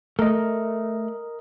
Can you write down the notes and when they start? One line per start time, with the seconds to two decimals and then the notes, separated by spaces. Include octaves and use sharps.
0.19 A3 A#4 D#5